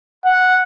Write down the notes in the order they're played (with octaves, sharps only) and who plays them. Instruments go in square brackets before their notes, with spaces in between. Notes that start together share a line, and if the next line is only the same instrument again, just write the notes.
[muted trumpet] F#5